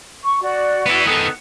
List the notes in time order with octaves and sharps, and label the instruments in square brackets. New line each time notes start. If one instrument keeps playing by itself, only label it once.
[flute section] C#6
F#4 D5
[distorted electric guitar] B3 E4
[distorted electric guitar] D#3 B3 [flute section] A4 D#6 F#6